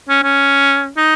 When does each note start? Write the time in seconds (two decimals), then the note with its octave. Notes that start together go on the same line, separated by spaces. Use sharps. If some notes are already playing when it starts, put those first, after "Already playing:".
0.09 C#4
0.23 C#4
0.97 D#4